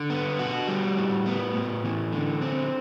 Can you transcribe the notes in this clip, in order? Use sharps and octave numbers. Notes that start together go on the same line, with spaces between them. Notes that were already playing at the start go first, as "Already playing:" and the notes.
Already playing: D3
B3
F#4
G3
A2
B3
A2
E3
D3
C4